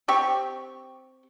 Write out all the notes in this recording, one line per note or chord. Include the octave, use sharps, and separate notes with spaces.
C4 G4 C#6